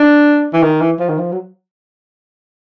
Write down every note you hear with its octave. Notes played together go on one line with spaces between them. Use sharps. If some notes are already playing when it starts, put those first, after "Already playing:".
Already playing: D4
E3
D#3
E3
F3
D#3
F3
F#3